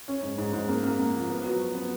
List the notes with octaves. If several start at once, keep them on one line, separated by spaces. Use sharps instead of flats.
C#4
G#2
G#2
G#2
A#3
A#3
A#3
F3
B3
F#3
F#3
B3